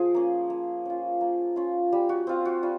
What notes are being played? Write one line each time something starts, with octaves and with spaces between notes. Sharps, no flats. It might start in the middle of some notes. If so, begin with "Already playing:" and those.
Already playing: F3 G#4
A#3 C#4
A#3
C#4 F4
A#3
C#4 F4
G3 G4
F#4
C4 F4
F#4
G3 F4